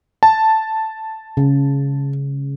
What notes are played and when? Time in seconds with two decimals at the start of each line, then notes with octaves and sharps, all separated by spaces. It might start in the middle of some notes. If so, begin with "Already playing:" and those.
0.23 A5
1.37 C#3